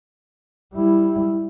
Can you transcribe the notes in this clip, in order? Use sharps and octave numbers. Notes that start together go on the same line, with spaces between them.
G3 E4